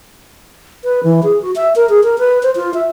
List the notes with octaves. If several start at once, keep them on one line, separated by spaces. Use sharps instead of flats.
B4
E3
G#4
F#4
E5
A#4
G#4
A#4
B4
C5
F4
E5